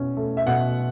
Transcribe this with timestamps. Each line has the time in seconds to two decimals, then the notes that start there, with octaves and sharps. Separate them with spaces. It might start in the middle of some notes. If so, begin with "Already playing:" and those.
Already playing: B2 C#4
0.17 A3
0.37 E5
0.47 B2 F#5